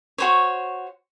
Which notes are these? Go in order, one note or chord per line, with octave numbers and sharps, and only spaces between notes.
F#4 C5 C#5